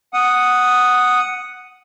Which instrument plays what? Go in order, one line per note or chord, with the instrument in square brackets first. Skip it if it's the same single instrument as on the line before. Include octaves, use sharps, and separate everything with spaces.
[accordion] F#5 D#6